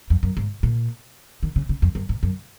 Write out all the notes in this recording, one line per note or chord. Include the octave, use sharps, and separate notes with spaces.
F2
F#2
G#2
A#2
D#3
C#3
C#3
F2
F#2
G#2
F#2